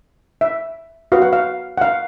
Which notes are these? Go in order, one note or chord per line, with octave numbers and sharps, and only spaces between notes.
E5
F#4 B4 F5
F#5
F5
F#5
F5